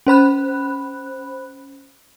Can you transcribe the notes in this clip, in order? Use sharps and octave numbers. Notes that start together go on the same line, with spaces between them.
C#4 C5 B5 F#6